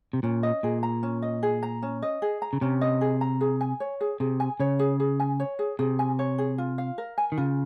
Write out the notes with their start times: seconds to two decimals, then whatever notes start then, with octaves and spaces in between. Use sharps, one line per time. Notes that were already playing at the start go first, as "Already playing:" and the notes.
0.13 C3
0.23 A#2 C#4
0.43 D#5
0.63 A#2 G#4
0.83 A#5
1.03 C#4
1.22 D#5
1.43 G#4
1.63 A#5
1.82 C#4
2.02 D#5
2.22 G#4
2.42 A#5
2.53 C#3
2.61 C3 C#4
2.81 D#5
3.01 G#4
3.21 A#5
3.41 G#4
3.61 G#5
3.80 C#5
4.01 G#4
4.20 C3 G#4
4.40 G#5
4.60 C#3 C#5
4.79 G#4
5.00 G#4
5.20 G#5
5.40 C#5
5.59 G#4
5.79 C3 G#4
5.99 G#5
6.19 C#5
6.38 G#4
6.58 F4
6.78 F5
6.98 A#4
7.18 G#5
7.32 D#3
7.38 C#3 F4